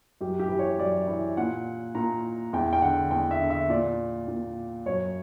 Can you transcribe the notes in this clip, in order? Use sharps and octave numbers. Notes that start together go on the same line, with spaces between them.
F#2 G4
G4
E3
C#5
F#2 D5
E3
A#2 F#5
A#2 A#5
E2 G5
G5
D3 F#5
E2 G5
E5
D3
E5
A#2 D5
A#2
F#2 C#5